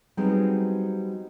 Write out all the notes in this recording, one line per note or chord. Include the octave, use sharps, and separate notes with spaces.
F#3 G3 B3 C4 D#4 G#4